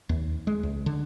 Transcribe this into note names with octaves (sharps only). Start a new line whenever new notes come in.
D#2
G#3
C#2
D3